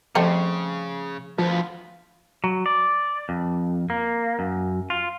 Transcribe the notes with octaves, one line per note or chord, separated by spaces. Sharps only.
C#3 F3 G3 A3 C4
D2 F3 B3
F#3
D5
F2
A#3
F#2
F4